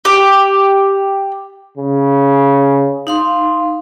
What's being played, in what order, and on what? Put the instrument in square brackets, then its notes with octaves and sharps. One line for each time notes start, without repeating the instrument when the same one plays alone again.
[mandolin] G4
[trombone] C#3
[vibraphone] D#4 F5 C6